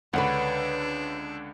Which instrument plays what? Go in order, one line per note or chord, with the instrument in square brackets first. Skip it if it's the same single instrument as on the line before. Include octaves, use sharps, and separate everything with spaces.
[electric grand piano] C#2 D3 [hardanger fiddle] D4 [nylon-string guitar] B4 C#5 F#5